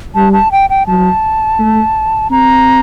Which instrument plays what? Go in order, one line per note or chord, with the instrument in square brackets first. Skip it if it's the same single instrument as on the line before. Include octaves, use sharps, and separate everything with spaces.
[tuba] G3 [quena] A5
[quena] A5
G5
G5
[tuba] F#3 [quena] A5
[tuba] A3
[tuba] C4 [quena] A#5